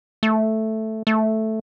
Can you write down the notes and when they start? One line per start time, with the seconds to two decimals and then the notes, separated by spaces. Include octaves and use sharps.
0.23 A3
1.07 A3